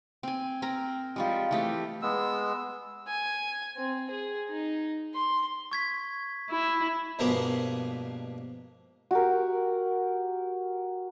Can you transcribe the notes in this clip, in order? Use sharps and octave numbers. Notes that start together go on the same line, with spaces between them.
C4 G#5
C4 A#4 A#5
F3 G3 G#3
E3 A3 G4
G#3 B3 E6
G#5
C4
G#4
D#4
C6
C#6 G#6 B6
E4
G2 B2 F3 G#3 A#3 B3
F#4 G4 A#4